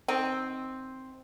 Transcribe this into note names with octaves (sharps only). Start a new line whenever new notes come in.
D#3 C4